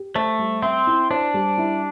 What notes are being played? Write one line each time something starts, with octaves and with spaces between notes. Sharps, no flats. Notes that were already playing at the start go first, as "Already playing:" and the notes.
Already playing: G4
A3 C5
G3
C4 E5
E4
D4 C5
G3
E4